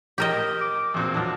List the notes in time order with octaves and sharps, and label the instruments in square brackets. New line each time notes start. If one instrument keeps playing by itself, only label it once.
[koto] G4 A#4 D#5
[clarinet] D6
[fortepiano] E2 A#2 C4 [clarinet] E6
[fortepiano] F3 F#3 D4